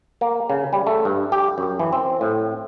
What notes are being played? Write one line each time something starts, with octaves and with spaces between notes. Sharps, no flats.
A#3
C#3
G3
A3
G2
G4
F#2
E3
C4
A2